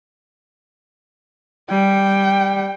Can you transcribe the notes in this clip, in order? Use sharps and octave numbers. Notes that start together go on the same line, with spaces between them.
G3 G5